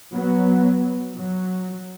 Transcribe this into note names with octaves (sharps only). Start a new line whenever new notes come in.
F#3 B3
F#3